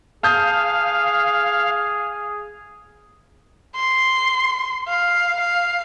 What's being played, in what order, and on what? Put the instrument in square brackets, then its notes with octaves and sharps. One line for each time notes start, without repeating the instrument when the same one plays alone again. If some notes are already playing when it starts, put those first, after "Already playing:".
[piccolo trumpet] G#4 [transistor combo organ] F5 [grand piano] A5 D#6 G6
[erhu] C6
F5
F5